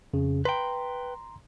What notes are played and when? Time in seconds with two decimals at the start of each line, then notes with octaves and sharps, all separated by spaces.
0.13 F2 C#3
0.45 B4 G5 A#5 C6